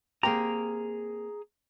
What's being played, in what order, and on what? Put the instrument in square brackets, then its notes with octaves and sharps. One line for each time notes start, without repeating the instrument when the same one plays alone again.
[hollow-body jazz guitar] A#3 C4 G4 [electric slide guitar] G#4 A#5